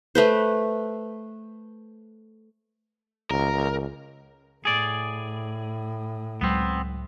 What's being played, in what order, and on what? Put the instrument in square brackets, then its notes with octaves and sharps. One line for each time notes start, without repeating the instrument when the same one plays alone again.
[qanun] A3 B4 C5
[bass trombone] C#2 [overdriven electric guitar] A#4
[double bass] A2 [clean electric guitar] G#4 D5
[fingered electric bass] C#2 F#3 G#3 [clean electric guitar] B3 C4